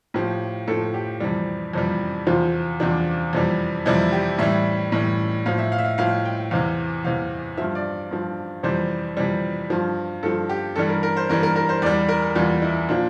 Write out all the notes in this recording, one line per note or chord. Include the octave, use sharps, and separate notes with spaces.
A2 F3 G4
A2 F3 A4
G4
F2 C3 E3 G3
F2 C3 E3 G3
E2 C3 F3 F4
E2 C3 F3 D4
F2 C3 E3 G3
F2 C3 E3 G3 E4
G4
A2 E3 G3 E5
A2 E3 G3
A2 F3 F5
E5
F5
E5
F5
A2 F3 F5
G5
E2 C3 E3 F5
E2 C3 E3 F5
G2 F3 E5
D5
G2 F3
F2 C3 E3 G3 C5
F2 C3 E3 G3
G2 F3
G2 F3 A4
G4
G2 E3 G3 A4
A#4
A#4
C5
G2 E3 G3 A#4
A#4
A#4
C5
E2 E3 G3 D5
A#4
E2 E3 G3 F4
E4
A#2 F3 D4